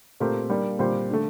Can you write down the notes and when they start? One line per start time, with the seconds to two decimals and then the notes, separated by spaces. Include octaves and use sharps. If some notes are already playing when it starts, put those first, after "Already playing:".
0.20 A#2 A3 C4 G4 A#4
0.50 G3 A#3 D4
0.79 A#2 G3 C4 G4 C5
1.11 D3 A3